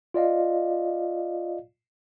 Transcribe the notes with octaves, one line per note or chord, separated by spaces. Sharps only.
F4 D5 D#5 F5